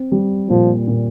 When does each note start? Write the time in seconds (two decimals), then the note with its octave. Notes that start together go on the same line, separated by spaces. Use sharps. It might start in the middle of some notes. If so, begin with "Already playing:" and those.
Already playing: C4
0.12 G3
0.50 A#2 F3
0.88 A#2